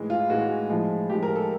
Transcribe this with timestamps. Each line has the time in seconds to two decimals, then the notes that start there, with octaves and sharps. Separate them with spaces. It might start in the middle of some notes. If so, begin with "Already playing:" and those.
Already playing: A2 E3 G#3
0.10 F4
0.30 A2 E3 G#3 F#4
0.69 A2 F3 G#3
1.09 A2 F3 G#3 G4
1.23 A#4
1.36 A4